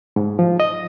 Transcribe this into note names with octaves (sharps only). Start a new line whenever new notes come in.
G#2
F3
D#5